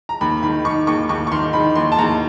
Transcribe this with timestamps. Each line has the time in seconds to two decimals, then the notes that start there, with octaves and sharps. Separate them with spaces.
0.09 A#5
0.21 D#2 B5
0.43 D#3 B5
0.65 D#3 C#6
0.87 D#2 C#6
1.09 D#2 C#6
1.27 C#6
1.32 D#3 C6
1.53 D#3 B5
1.75 D#2 C6
1.92 A5
1.98 D#2 A#5